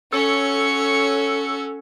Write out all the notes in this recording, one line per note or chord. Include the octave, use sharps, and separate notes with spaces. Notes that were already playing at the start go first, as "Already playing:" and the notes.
C#4 F#4 A4 C#5 C#7